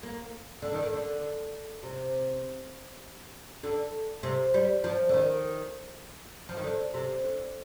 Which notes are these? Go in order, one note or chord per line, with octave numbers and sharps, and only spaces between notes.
A#3
D3
D#3
D3
D3
C3
D3
C3
G3
F3
D3
D#3
F3
D#3
D3
C3
D3